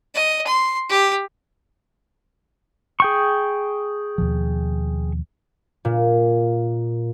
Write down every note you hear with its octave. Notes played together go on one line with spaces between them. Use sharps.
D#5
C6
G4
G#4 G5 C#6
D#2 B2 F3
A#2